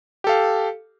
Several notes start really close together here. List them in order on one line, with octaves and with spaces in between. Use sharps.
G4 A4 F5